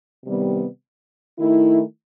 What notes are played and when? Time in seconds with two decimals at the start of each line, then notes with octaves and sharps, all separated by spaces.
0.24 C3 D#3 G3 B3
1.39 D#3 A3 E4